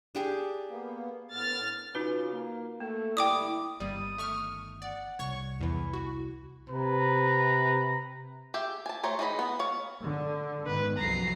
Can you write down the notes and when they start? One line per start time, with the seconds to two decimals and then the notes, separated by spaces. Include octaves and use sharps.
0.15 D4 G4 G#4
0.70 A#3 B3
1.32 A2 B3 F6 A6
1.95 C#3 D#4 F4 F#4 B4
2.32 A#3
2.80 A3 A#3
3.17 G2 D3 E4 D5 G5 D6 D#6
3.80 G1 D#3 G3 A#3 D#6
4.18 A3 C#6 F6
4.82 D5 F#5
5.19 C2 C#5 C#6
5.60 E2 E3 E4
5.94 F#4
6.70 C3 B4 A#5
8.54 G4 G#4 E5 G5
8.86 G#5 A5
9.03 A3 C5 C#5 A#5
9.19 E3 D#4 G#4 D#5 B5
9.39 B3
9.59 C#5 F5
10.00 D3
10.67 G#2 D#3 B3 B4
10.98 C2 F2 F#3 A#5 C7